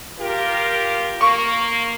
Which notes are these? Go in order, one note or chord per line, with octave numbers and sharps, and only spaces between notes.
F4 G4 A#4
A#3 C#6